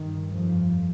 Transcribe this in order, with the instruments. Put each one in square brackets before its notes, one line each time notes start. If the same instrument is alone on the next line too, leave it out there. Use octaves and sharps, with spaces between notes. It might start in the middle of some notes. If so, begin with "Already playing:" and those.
Already playing: [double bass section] G2 D#3
F2 F3